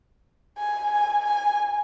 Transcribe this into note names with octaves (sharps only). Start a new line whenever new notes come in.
G#5
G#5
G#5